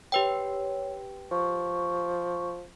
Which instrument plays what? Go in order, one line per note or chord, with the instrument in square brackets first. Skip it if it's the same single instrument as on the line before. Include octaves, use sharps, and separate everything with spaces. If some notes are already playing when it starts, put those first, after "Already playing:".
[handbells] G4 B4 G5 [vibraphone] C#5
[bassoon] F3 [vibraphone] C#6